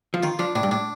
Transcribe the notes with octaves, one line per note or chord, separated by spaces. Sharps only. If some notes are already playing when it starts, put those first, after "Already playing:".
F3
D#3 F4
F3 D4
A2 D4
G2
A2 D4